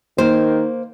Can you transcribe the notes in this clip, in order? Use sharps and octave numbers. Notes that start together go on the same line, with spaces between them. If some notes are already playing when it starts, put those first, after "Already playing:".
D#3 A#3 C5